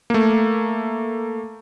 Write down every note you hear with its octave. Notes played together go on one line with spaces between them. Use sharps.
A3 A#3